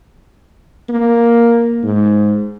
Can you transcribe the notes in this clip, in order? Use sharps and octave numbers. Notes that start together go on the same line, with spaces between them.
A#3
G#2